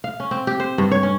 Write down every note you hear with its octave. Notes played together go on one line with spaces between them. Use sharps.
F5
C#4
C4
G4
C5
G2
C#5
C#4